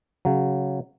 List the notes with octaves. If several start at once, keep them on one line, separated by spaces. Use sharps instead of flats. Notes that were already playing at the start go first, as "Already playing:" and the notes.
C#3 F#3